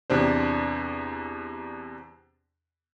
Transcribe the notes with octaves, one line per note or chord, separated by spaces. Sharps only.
E2 C3 D4 C5